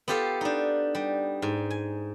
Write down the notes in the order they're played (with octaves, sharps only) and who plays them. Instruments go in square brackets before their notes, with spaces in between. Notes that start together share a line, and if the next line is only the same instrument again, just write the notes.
[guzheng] B3 F4 G4 A4 F5
D4 D#4
G3
G#2
G#5